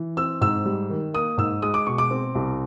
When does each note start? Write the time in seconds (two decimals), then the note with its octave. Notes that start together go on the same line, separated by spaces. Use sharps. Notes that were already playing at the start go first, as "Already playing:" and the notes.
Already playing: E3
0.17 C4 E6
0.41 G#2 E6
0.66 G3
0.90 D#3
1.14 A#3 D#6
1.38 G#2 E6
1.62 G#3 D#6
1.74 D6
1.87 B2 C#6
1.98 D6
2.11 C4
2.35 C2